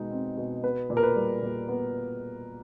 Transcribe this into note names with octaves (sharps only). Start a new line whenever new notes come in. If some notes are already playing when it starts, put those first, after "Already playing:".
Already playing: B2 G#3 D#4
C4
B2
B3 B4
A#2
A#4
B4
G3
A#2
B3